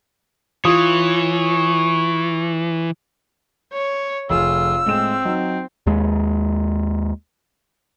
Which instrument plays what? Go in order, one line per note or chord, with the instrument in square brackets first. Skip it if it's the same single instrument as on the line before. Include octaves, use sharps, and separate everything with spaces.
[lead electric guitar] E3 [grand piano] F4 D#6 [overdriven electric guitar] C#5
[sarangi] C#5
[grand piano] F1 G#4 [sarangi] F4 [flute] E6
[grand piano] A2 G#3 E7 [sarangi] C4
[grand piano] F#3 D#4
[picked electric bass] D#2 G#3